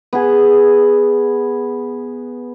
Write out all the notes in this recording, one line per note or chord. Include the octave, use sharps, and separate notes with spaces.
B3 G#4